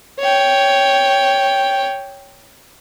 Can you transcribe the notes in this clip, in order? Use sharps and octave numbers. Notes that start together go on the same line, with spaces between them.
C#5 G5